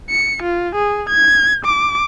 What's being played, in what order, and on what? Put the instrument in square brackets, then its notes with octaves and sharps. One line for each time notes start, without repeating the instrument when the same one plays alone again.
[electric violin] C#7
F4
G#4
G#6
D6